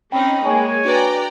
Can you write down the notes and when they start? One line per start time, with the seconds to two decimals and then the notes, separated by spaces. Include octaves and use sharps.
0.12 C4 C#4 D#4 G5 B5
0.45 G#3 A#3 C#5 G#5
0.85 D4 F#4 B4 D5 G5 A#5